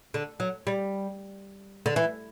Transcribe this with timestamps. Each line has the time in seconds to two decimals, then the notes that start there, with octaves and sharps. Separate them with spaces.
0.14 D3
0.40 F#3
0.67 G3
1.86 D3
1.96 E3